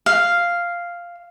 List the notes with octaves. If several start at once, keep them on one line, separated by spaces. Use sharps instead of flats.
F5